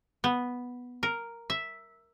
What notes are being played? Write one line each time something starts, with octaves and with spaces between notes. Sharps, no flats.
B3
A#4
E5